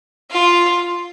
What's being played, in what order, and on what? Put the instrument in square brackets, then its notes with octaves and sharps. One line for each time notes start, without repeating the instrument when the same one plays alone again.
[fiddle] F4